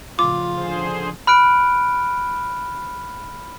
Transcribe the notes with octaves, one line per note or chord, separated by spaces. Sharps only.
A2 C#3 F3 F4 D6
D3 G#4 C5
B5 F6 F#6 D7